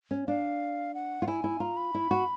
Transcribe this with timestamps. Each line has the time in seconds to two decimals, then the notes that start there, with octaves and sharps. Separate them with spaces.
0.11 C#4
0.28 D4 F5
0.94 F#5
1.22 F4
1.28 E4 G#5
1.44 E4
1.60 F4 A#5
1.77 B5
1.94 E4
2.11 F#4